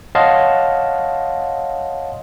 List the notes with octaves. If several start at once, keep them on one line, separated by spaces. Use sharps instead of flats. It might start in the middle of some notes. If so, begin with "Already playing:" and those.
C#5 D#5 F5 F#5 A5 C6